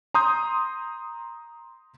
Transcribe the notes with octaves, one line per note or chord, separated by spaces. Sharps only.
A#5 C6 D#6 G6